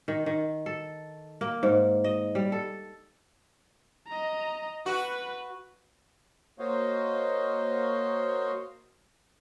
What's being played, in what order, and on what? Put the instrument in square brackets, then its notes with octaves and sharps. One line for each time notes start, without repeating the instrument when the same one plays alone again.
[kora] D#3
D#3
A4
A#3
G#2
D#5
G3
A4
[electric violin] D#5 A#5
[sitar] F#4 [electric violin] B4
[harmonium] A#3 F#4 C5 C#5 D#5 F5